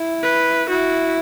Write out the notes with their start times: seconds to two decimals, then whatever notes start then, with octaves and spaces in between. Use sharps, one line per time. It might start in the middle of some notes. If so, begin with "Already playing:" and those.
Already playing: E4
0.23 B4
0.69 E4 F#4